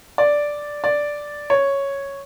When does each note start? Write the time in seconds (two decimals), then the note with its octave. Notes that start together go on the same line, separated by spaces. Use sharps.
0.18 D5
0.84 D5
1.50 C#5